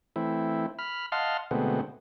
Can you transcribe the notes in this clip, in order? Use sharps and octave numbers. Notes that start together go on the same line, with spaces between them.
E3 A3 C4 E4
B5 F6
D#5 F5 F#5 A5 C6 F6
B2 D3 G#3 A3 B3 C4